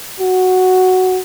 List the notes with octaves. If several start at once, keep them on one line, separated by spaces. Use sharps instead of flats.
F#4